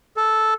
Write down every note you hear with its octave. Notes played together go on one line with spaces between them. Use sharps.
A4